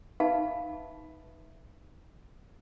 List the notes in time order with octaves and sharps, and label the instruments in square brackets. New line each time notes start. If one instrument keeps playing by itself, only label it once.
[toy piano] D#4 B4 E5 F5 A5 B5